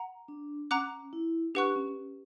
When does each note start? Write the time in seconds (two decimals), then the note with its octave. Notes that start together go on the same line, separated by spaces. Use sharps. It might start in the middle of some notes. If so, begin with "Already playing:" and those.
Already playing: F#5 A#5
0.28 D4
0.71 C#4 F#5 A#5 D6 F#6
1.13 E4
1.55 D4 G4 B4 F#5 C#6 F#6
1.76 C#4